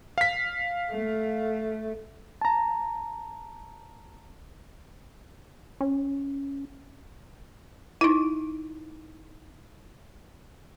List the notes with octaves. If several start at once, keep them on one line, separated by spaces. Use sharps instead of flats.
F5 B6
A3
A5 A#5
C#4
D#4 E4